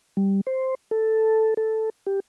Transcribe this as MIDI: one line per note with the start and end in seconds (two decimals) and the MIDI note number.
0.17 0.41 55
0.47 0.75 72
0.91 1.54 69
1.57 1.90 69
2.06 2.20 67